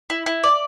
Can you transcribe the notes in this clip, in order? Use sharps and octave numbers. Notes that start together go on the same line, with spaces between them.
E4
E4
D5